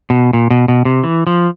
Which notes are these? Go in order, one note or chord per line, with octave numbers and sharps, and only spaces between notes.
B2
A#2
B2
B2
C3
E3
F3